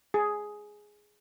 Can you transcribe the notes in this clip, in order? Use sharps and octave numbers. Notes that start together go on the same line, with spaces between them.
G#4